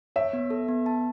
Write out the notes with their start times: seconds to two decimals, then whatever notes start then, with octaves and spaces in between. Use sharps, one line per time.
0.16 C#5 E5
0.33 B3
0.50 A4
0.68 B3
0.86 A5